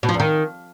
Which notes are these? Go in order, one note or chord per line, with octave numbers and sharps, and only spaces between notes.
B2
F3
E2
D#3